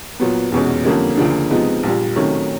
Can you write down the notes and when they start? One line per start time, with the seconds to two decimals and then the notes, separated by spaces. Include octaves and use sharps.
0.20 A#2 F#3 B3
0.52 F1 E2 B2 G#3 C#4
0.85 F2 D3 G3 A#3 C#4
1.17 D2 C#3 F3 A#3 D4
1.50 C3 F3 G#3 B3 D#4
1.83 A#1 A#2 G3
2.15 C3 D#3 F#3 A3 C#4